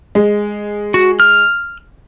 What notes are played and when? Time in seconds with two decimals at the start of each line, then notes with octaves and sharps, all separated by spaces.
0.15 G#3
0.94 F#4
1.20 F6